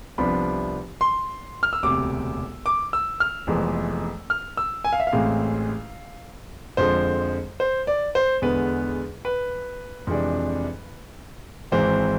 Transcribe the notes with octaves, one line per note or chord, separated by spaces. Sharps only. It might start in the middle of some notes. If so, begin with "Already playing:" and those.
C2 C3 F3 B3 D4 B5
C6
F6
E6
E1 D2 C3 D6
D6
E6
F6
F1 F2 E3 G#3 B3
F6
E6
G#5
F5
E5
F5
A1 A2 E3 G#3 C4
F2 D3 F3 G#3 C5
C5
D5
C5
E2 D3 G#3 B3 B4
B4
F2 C3 E3 G#3 D4
G#1 G#2 E3 G#3 C4 C5